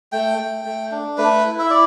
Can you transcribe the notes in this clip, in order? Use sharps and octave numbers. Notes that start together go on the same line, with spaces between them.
A3 G5
A3
A3
D4
A3 B4
E4
E5
E4 D5